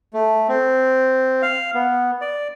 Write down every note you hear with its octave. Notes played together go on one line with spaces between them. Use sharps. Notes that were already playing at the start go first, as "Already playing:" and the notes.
A3
C4
F5
B3
D5